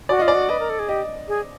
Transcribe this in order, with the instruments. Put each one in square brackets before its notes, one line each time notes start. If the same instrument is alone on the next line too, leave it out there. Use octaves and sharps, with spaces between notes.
[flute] F#4 [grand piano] D5
[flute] F4 [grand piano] D#5
[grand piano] D5
[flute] F#4
[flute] B4 [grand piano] D#5
[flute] A#4
A4
G#4
[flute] G4 [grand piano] D#5
[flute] G#4